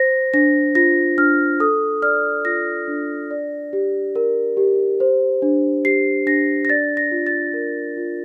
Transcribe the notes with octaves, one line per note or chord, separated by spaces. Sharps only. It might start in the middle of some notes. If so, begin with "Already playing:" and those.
Already playing: C5 A#6
D4 A#6
F4 A#6
D4 F6
A4 D#6
D5 F6
F4 A#6
D4
D5
G4
A#4
G4
C5
D4
G4 C7
D4 A#6
A#6
D5 A6
A#6
F4
A6
A#4
F4